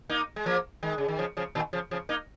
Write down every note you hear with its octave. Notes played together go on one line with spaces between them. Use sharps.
A#3 D#4
G#3
F3 A#3
D#3 G#3
C#3
D#3
C#3 F3
C#3 F3
A#2 D#3
C#3 F3
C#3 F3
A#3 D#4